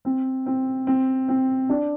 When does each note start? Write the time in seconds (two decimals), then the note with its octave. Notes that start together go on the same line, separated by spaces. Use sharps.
0.05 C4
0.46 C4
0.87 C4
1.28 C4
1.69 D4